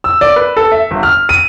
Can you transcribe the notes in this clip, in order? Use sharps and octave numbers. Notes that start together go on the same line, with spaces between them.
E6
D5
B4
A4
E5
G1
F6
D#7